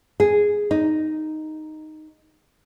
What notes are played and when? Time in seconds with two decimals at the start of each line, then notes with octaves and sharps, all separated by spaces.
0.20 G#4
0.71 D#4